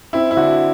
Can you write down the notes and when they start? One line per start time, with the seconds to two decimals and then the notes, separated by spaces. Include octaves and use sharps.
0.13 C4 E4
0.31 E4
0.37 D3 F#4